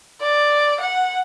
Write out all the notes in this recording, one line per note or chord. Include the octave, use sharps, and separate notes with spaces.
D5
F#5